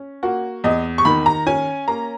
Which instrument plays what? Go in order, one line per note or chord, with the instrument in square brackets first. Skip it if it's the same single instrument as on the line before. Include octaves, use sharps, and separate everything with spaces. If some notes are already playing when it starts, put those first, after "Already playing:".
Already playing: [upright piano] C#4
A#3 F#4
E2 D#5
C#6
D#3 B5
A#5
C#4 G#5
A#3 A#5